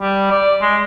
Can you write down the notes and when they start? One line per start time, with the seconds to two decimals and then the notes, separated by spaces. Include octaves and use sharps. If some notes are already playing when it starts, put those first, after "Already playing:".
0.01 G3
0.31 D5
0.62 G#3